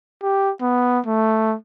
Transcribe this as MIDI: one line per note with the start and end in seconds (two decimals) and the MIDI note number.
0.23 0.52 67
0.61 1.00 59
1.06 1.56 57